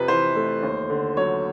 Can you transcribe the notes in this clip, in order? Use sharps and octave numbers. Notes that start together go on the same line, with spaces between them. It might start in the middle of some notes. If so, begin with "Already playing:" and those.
Already playing: F2 C3 B4
E3 C5
A3
D#2
D3
F#3 C#5